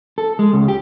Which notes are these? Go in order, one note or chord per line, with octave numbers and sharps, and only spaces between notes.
A4
G#3
C#2
G4